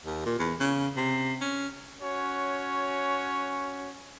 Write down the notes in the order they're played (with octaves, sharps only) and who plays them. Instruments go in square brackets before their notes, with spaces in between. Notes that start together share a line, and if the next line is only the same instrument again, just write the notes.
[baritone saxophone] D#2
A#2
E2
C#3
C3
C#4
[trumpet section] C#4 F#4 C#5